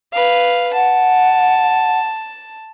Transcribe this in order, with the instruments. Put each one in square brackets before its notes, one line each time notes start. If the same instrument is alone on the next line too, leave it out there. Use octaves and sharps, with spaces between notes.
[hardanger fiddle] B4 F5
[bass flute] F#5 [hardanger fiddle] A5